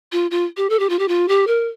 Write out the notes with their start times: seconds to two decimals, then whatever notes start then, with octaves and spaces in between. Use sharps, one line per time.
0.12 F4
0.31 F4
0.57 G4
0.70 A4
0.79 G4
0.90 F4
0.99 G4
1.08 F4
1.28 G4
1.47 A#4